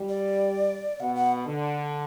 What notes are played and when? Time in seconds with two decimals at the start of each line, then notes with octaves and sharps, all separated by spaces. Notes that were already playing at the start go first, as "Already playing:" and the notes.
Already playing: G3
0.09 D5
1.00 B2 F#5
1.15 F#5
1.46 D3